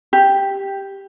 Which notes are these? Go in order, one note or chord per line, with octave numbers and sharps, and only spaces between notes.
G4